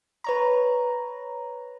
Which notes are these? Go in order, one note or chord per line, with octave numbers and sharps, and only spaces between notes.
B4 C#5 A#5